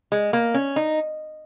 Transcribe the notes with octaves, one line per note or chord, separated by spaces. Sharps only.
G#3
A#3
C#4
D#4